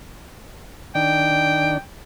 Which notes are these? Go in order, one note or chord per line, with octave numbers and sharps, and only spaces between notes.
D#3 D4 G5